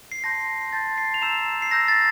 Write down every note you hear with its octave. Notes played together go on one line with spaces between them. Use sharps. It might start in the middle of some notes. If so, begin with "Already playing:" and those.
C7
A5 C6 G6 A#6
A5 C6 G6 A6
C7
F7
A#5 E6 G6 E7
C7
A#5 E6 G6 A#6
A6